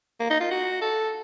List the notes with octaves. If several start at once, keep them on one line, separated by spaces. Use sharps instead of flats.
A#3
D#4
F4
F#4
A4